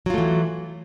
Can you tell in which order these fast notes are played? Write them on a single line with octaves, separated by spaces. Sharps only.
F#3 F4 A3 E3